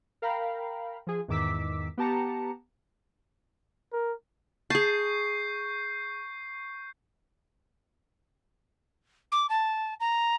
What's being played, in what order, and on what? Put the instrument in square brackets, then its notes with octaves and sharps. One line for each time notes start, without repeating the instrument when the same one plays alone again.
[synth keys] A#4 F5 G5 A#5 B5
F3 G#4
E2 G#2 D#3 D6 E6 B6
B3 G4 A5 A#5 C#7
[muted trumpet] A#4
[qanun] G#4 A5 [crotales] C#6 G6 C7
[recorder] D6
A5
A#5